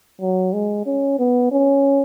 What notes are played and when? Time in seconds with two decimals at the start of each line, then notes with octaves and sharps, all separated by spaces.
0.21 F#3
0.53 G#3
0.86 C#4
1.19 B3
1.52 C#4